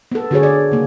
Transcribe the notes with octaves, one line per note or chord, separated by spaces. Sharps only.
B3 A4
D3 F#4 G#4 C#5
D5
C#3 A#3